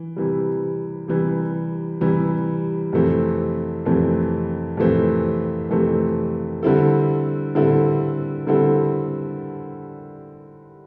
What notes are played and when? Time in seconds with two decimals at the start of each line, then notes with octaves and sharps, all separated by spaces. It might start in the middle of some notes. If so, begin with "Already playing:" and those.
Already playing: E3
0.16 C3 E3 G3
1.08 C3 E3 G3
2.01 C3 E3 G3
2.93 F2 C3 E3 A3 C4
3.85 F2 C3 E3 A3 C4
4.77 F2 C3 E3 A3 C4
5.71 F2 C3 E3 A3 C4
6.63 D3 G3 C4 E4 A4
7.55 D3 G3 C4 E4 A4
8.47 D3 G3 C4 E4 A4